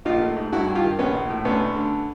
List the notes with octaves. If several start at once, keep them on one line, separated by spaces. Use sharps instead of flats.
A#1 D#4 F4
A3
G#2
G2 E4 F#4
G2
F4 G4
D#3
A#1 B3 C#4
A#1
A2
D2 B3 C#4
D2
D3